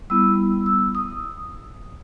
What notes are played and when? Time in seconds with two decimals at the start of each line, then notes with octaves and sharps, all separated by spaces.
0.10 G3 B3 E4 E6
0.66 E6
0.95 D#6